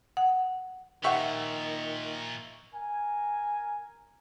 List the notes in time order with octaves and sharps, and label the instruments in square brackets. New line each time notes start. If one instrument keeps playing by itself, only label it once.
[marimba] F#5
[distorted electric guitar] A#2 F3 [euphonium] D#3 [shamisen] G4 F#5 [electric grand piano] E5 C#6
[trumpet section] A#4 G#5